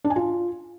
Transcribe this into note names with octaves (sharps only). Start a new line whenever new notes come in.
D4
G#5
F4